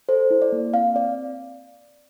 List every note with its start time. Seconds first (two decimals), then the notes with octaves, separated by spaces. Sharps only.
0.09 A4 C5
0.31 E4
0.42 D5
0.52 A#3
0.74 C4 F5
0.95 C4 D5